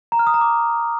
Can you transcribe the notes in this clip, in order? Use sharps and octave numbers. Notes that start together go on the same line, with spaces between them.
A#5
F6
D#6
A#5
D6